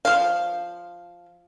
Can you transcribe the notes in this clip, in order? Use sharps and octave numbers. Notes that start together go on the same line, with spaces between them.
F3 F5